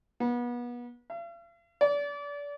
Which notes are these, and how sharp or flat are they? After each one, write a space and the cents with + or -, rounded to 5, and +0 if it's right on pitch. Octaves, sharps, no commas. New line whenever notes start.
B3 -30
F5 -45
D5 -30